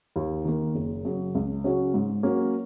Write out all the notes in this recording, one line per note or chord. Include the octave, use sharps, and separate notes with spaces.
D#2
D#3 A#3
F#1
F#2 C#3
C#2
C#3 F#3 C#4
G#2
F#3 A#3 C#4